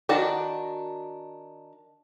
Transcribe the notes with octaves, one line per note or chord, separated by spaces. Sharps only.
D#3 D4 F#4 A5